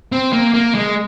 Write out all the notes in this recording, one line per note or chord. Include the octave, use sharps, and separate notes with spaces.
C4
A#3
A#3
G#3